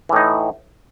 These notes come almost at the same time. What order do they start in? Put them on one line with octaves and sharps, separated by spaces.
E3 A2 D#4